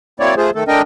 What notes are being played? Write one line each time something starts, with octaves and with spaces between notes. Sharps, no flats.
F#3 A#3 C4 E4 C#5 D5
A3 F4 G#4 C5
D#3 A3 A4
A3 D4 A#4 D#5 G5